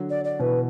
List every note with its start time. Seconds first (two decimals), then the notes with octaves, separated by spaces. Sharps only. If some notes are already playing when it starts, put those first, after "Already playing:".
Already playing: D3 F#3
0.09 D5
0.24 D5
0.39 B2 E3 B4